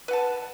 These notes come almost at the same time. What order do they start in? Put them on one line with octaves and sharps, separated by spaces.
B4 F#5 A5